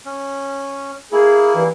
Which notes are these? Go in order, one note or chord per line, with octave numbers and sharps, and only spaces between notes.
C#4
A#3 E4 G#4
G2 E3